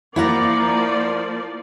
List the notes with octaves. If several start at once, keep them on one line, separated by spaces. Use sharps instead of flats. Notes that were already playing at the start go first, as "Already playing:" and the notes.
F3 A#3 E4 D5 F#5 A#5